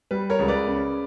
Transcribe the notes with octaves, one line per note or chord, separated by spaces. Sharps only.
G3 B4
A#4 C#5
C#2
B4 D5
C#3